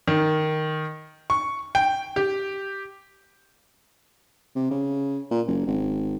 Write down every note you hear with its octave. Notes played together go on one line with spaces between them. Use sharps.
D#3
C#6
G5
G4
C3
C#3
A#2
F#1
G#1